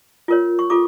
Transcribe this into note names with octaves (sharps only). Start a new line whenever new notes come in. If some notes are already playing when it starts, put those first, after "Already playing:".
F4 A#4 C#5
C#6
F4 A4 D6